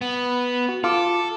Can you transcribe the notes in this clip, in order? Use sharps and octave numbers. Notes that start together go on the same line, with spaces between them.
B3
F#4
F4 A4 D6